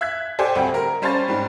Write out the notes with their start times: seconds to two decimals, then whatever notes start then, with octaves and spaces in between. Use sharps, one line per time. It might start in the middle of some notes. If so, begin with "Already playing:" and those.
0.01 E5 F#6 G#6 B6
0.39 G4 A4 C5 D5 G5 G#5
0.55 D2 G3 C4
0.74 A#4
1.02 G3 C#4 C5 C#5 A5 A6
1.28 G#2 G3